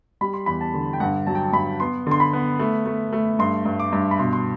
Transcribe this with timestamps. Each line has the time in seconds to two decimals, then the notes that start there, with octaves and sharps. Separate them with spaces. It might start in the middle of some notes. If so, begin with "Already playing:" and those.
0.21 G3 B5
0.34 C6
0.46 E2 B5
0.61 A5
0.74 D3
0.93 G5
1.00 G2 F#5
1.27 F#3 A5
1.35 G5
1.44 A5
1.53 G2 B5
1.80 B3 C6
2.07 D3 C6
2.20 B5
2.33 B3
2.59 A3
2.86 A3
3.13 A3
3.39 G2 C6
3.65 G2
3.80 D6
3.92 G2
4.11 B5
4.19 B2 C6
4.33 C6